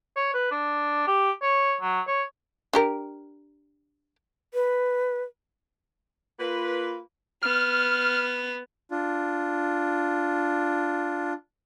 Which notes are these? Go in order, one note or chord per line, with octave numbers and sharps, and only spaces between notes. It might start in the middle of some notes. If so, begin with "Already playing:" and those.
C#5
B4
D4
G4
C#5
F#3
C#5
D4 G4 A#4
B4
A#3 F4 B4
B3 F6
D4 F4